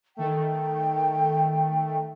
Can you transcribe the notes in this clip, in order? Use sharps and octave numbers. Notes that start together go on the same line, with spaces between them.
D#3 A3 G5